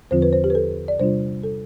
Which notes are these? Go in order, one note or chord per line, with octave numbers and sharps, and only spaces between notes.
E2 D3 F3 C4 F4 C5
B4
C5
G4
B4
A4
D5
C3 G3 D4 F4 C5
A4